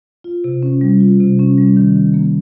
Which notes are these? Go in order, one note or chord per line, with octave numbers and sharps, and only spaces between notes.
F4
C3
C#4
G3
F4
C3
C#4
G3
D#3
D#3
A#3